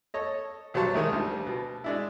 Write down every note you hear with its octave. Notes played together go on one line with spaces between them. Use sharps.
A4 C#5 D#5
B1 F#3 G3 C5 A5 C#6
D#3 G#3 A3
D2 F3 G3
B2
G#3 D4 E4